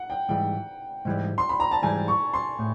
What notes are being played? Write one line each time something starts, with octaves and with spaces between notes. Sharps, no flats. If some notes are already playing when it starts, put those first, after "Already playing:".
Already playing: F#5
G5
G#2 E3 G3 G5
G#2 E3 G3
C6
B5
A#5
A5
G#2 E3 G3 G#5
C#6
C6
A2